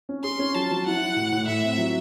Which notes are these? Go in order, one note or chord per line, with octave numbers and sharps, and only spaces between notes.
C#4
G#4 C6
C#4
F#3 A5
F#3
E4 F#5
E4
A2
A2
A2 E5
C4
F#3